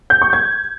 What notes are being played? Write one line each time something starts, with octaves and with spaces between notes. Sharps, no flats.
G6
C#6
G#6